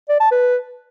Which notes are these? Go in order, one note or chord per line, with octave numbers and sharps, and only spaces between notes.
D5
A5
B4